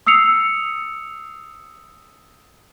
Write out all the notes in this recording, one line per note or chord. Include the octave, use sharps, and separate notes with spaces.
D#6 E6 C7 C#7 F7